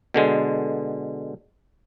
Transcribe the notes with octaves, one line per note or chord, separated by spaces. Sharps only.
B2 D3 G#3